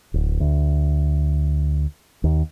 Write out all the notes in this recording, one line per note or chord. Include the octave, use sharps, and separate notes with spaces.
D1
D2
D#2